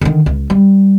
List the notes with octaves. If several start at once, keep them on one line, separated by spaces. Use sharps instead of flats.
D3 D#3
C#2
G3